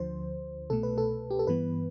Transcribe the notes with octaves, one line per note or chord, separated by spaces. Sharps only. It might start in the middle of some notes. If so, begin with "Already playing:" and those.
Already playing: D2 D3 F3 C5
C2 B2 A3 A4
B4
A4
G4
A4
G2 E3 B3 B4